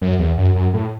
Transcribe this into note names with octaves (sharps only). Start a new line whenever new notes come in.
F#2
E2
F#2
F#2
A2